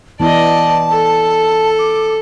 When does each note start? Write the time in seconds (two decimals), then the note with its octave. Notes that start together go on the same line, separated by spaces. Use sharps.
0.20 E3 B3 E4 D5 D#5 A5
0.92 A4
1.79 D6